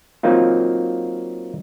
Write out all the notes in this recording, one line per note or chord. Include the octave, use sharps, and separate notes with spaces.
F#3 A#3 C4 D#4 F4